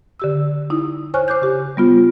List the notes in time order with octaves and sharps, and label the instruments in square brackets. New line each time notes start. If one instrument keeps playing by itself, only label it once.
[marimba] D3 G4 E6
D#4 E4
C5 C#5 G#5 C#6 F6 F#6
C5 D6 F#6 G6
C#3 G4
G3 B3 F4